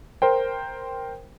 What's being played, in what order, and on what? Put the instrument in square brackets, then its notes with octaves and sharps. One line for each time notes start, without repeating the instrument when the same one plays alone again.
[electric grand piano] A#4 C5 G5